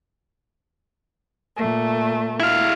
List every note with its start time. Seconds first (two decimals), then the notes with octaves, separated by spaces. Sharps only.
1.56 A#2 A3
2.40 E4 F5